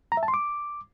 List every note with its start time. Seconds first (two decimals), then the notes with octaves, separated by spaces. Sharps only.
0.12 A#5
0.17 E5
0.23 A5
0.28 C6
0.34 D6